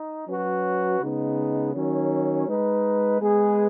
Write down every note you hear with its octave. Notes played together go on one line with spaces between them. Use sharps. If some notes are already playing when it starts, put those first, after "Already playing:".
Already playing: D#4
F#3 C#4 F#4 B4
C#3 G#3 B3 D#4
D#3 F#3 C#4
G#3 D#4 B4
G#3 B3 G#4 B4